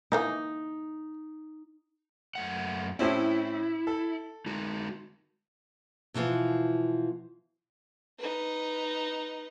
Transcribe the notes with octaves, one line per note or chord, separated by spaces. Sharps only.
D3 E3 A#3 D#4
F#2 A3 F#5
A2 C4 C#4 E4
A4
G#3 D#4 F#4
B2 E3 F3 B3
D#4 B4